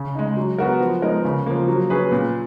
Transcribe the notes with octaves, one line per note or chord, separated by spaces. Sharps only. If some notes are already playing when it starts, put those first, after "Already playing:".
Already playing: C#3
G#3 D#4
F#3
B3 F#4 A#4
F3
G#3 B3 D#4 A#4
C#3
F3 A#3
F#3
C#4 G#4 B4
A#2